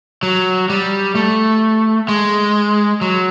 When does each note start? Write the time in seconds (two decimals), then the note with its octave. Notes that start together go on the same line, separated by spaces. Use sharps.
0.23 F#3
0.70 G3
1.15 A3
2.08 G#3
3.01 F#3